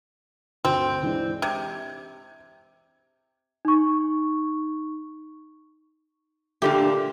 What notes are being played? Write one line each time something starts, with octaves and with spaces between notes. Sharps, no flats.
D2 C4
E3 G#3 D4
C3 G#6
D#4 C#6
A#2 D3 A3 G4